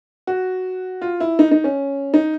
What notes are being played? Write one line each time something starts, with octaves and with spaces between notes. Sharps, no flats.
F#4
F4
E4
D#4
D#4
C#4
D#4